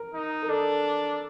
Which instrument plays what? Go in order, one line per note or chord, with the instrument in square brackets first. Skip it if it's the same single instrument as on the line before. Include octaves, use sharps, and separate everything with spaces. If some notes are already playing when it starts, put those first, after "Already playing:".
Already playing: [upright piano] A#4
[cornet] D#4
[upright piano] A#4
[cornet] D4 [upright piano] A4